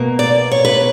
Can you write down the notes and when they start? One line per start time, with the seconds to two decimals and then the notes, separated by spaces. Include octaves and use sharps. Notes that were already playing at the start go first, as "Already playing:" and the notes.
Already playing: B2 A#3
0.19 D5
0.51 C#5
0.65 B4